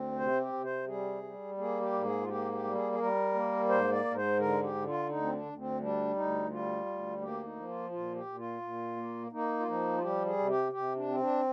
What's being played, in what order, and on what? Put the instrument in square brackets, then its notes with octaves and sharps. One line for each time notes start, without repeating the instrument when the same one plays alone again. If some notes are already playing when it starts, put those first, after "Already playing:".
Already playing: [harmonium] D2 C4
C3 C5
G4
C3
C5
G3 G#4
G3
A#3 G#4
G4
G#2
G#4
F4
A#3 G4
G4
G3
G#4
G#4
G3 A#4
A#3
G#2 C5
D5
G#2
A#4
C5
D3 A#4
G4
D3
F4
D2 D#4
C4
D4
D2
C4
G3 D4
D2 D#4
G3 F4
D2
A#3 G4
D#4
F3
F4
A#2 F4
G4
A#2
F4
A#2
A#3
A#3 D#4
F4
F3 D#4
F4
G3 G4
G#4
C3
G4
C3 G4
D4
C4
D4